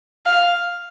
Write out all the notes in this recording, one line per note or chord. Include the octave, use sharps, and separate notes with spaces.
F5